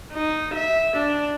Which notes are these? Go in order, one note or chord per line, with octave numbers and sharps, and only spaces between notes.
D#4
E5
D4